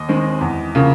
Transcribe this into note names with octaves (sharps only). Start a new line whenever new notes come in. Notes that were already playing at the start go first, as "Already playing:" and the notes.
Already playing: D#2 D#5
D#3 G#3 C4
E2
C#3 F3 A#3